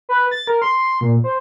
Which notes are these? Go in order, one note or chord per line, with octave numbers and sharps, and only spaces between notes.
B4
A6
A#4
C6
A#2
C5